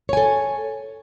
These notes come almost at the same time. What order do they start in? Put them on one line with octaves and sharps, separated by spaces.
C#5 G#5 A4